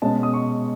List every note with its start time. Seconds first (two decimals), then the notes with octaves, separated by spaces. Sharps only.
0.02 B2 G#3 C#4 A5
0.23 D#6
0.34 C#6